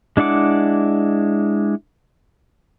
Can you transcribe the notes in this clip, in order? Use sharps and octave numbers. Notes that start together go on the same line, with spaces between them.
G#3 D4 E4 F#5 D6